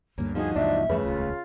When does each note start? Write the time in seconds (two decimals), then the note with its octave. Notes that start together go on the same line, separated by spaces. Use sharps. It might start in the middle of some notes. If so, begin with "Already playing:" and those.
0.18 D2 G2 D3 A#3 C#4
0.35 F3 D#4 F#4 G#4
0.56 C#2 F#2 A#2 D4 E5
0.89 E2 G2 C#3 F3 A3 B4
1.04 D#1 C#2 F4